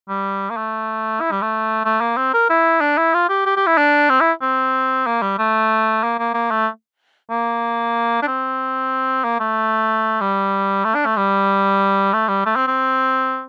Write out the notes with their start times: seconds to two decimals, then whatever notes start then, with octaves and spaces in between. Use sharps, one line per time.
0.08 G3
0.50 A#3
0.57 A3
1.21 E4
1.31 G3
1.42 A3
1.85 A3
2.01 A#3
2.17 C4
2.34 A#4
2.50 E4
2.81 D4
2.98 E4
3.14 F4
3.29 G4
3.46 G4
3.57 G4
3.67 E4
3.77 D4
4.09 C4
4.21 E4
4.42 C4
5.06 A#3
5.22 G3
5.38 A3
6.03 A#3
6.19 A#3
6.34 A#3
6.50 A3
7.30 A#3
8.22 D4
8.27 C4
9.24 A#3
9.40 A3
10.21 G3
10.84 A3
10.95 D4
11.06 A3
11.16 G3
12.13 A3
12.28 G3
12.46 A3
12.56 C4
12.67 C4